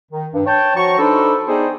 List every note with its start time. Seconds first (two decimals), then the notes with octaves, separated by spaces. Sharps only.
0.12 D#3
0.34 G2
0.46 C#5 G5 A5
0.76 F3 F#4 C#5 A#5 C#6
0.99 D4 D#4 A4 B4 C5
1.48 B3 D#4 G#4 C5 D5 G5